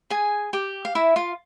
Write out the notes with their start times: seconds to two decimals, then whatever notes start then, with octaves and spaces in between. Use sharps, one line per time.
0.10 G#4 G#5
0.53 G4 G5
0.85 F5
0.95 E4 E5
1.16 F4 F5